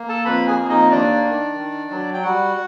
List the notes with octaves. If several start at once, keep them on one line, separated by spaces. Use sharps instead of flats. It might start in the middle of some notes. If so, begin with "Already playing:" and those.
Already playing: A#3
A4 A5
F2 B4 B5
G#4 G#5
A#3
D#4 D#5
D#2 D4 D5
D#3
D#3
F#3
G5
G3 F#4 F#5